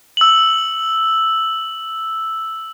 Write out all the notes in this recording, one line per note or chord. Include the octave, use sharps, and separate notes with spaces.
E6 F#7